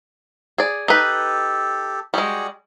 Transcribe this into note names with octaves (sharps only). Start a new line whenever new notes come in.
G#4 D5
D#4 G4 A4 B4
G3 G#3 F#4 G#4 F#5